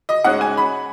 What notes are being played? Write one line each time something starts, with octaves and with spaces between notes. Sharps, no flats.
D#5
G#2 G#3 C#4 F#5
G#5
B5